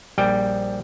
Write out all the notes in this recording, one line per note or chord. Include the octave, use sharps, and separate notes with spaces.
A#1 G3 G5